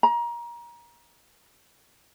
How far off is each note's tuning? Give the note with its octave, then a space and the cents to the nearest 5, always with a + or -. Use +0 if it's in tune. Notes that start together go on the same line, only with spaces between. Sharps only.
A#5 +25